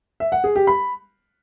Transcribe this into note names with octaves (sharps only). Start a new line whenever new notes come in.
E5
F#5
G#4
G4
B5